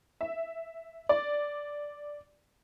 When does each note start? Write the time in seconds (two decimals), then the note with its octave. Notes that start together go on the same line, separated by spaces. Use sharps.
0.21 E5
1.09 D5